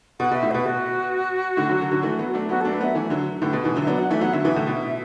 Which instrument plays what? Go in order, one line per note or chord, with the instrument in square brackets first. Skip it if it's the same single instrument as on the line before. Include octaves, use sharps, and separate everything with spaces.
[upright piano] B2 [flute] F#5
[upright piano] B2 [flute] E5
[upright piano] A2
[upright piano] B2 [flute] B4
[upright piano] B2 [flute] F#4
[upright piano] A2 D3
D3 F#3
D3 F#3
D3 F#3
E3 A3
F#3 B3
A3 D4
[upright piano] F#3 B3 [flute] F#4
[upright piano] A3 D4 [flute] A4
[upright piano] A3 [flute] B4
[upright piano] F#3 B3 [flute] E5
[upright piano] E3 A3
D3 F#3
[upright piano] A2 D3 [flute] B4
[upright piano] B2
B2 E3
D3 F#3
[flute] E5
[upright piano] F#3 B3 [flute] D5
[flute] F#5
[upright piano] E3 A3 [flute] E5
[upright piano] F#3 B3 [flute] F#5
[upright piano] D3 F#3 [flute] E5
[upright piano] B2 E3
A2 D3
B2